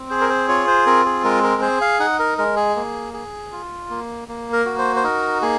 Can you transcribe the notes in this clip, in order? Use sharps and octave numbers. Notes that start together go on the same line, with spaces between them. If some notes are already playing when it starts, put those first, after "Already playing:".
Already playing: C4
G#4 C5
A#4
C5
F4 C#5
C5
C4 A#4
G#4
G#3 A#4
A#4
G#4 C5
F5
D#4 F#5
A#4
G#3 A#4
G#4
A#3
G#4
F4
A#3
A#3
A#4
F#4
C5
C5
D#4 A#4
A#3 G#4